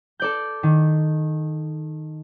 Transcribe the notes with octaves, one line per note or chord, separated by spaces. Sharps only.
A4 D5 G6
D#3